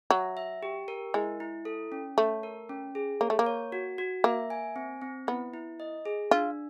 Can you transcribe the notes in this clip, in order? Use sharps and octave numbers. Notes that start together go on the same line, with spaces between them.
F#3 E5
E5
G4
A#4
G#3 E4
E4
A4
C#4
A3 C#5
A#4
C#4
G#4
A#3 C#5
A3
A#3
C#5
F#4
F#4
A#3 E5
G#5
C4
C4
B3 E4
E4
D#5
G#4
D4 F4